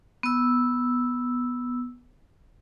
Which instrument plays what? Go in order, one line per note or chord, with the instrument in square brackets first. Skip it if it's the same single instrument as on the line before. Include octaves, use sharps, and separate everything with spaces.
[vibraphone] B3 E6